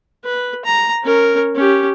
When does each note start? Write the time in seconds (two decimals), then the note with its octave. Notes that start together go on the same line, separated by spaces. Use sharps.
0.25 B4
0.65 A#5
1.04 C#4 A#4
1.55 C#4 G4